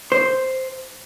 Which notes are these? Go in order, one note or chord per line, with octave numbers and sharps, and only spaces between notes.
C5